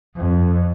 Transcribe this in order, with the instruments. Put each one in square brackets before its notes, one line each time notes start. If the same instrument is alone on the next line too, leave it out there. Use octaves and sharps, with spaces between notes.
[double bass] F2